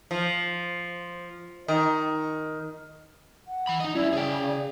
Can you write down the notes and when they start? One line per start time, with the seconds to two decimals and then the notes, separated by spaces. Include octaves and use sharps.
0.11 F3
1.68 D#3
3.48 F#5
3.67 E3 B5
3.80 D#4 D#5
3.95 G3 C#4 E4 D5
4.13 C#3 G#4 G5